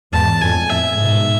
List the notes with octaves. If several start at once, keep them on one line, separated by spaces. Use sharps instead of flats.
E2 G#2 A5
F2 A2 G#5
F2 A2 E5
G#2 B2